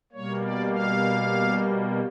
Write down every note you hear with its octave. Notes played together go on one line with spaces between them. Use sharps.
B2 G3 A#3 C#5
D5
F5